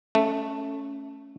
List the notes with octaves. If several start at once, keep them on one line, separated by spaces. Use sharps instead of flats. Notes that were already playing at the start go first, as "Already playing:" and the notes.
A3 C#4